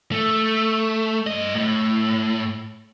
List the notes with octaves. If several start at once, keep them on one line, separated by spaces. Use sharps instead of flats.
A3
G2 D#5
A2